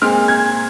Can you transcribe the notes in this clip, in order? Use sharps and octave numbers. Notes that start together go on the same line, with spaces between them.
A#2 G#3 C4 F6
G#6